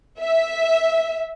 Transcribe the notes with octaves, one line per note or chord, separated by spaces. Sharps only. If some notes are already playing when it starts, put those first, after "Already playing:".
E5